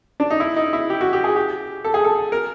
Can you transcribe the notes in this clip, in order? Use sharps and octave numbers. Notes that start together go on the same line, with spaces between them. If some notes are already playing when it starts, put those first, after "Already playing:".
D4
D#4
E4
D#4
E4
G4
F#4
G4
G#4
G4
A4
G#4
A4
A#4